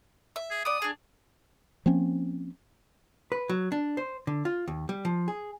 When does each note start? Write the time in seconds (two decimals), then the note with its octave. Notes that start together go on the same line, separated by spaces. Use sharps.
0.36 E5
0.51 G#4
0.65 B3 D5 D#6
0.82 D4 G#4
1.86 F3 A#3 C4 C#4
3.32 B4
3.49 F#3
3.72 D4
3.97 C5
4.27 D3
4.45 F4
4.68 D#2
4.89 G3
5.05 F3
5.28 G#4